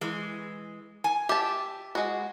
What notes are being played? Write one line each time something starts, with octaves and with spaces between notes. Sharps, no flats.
E3 G#3
G#5
G4 E5 A5
G#3 F#4